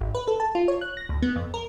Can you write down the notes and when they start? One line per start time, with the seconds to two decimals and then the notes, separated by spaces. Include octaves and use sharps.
0.01 G#1
0.15 B4
0.28 A4
0.40 A5
0.55 F4
0.68 C#5
0.81 F#6
0.97 A#6
1.09 D2
1.22 B3
1.36 F2
1.54 A#4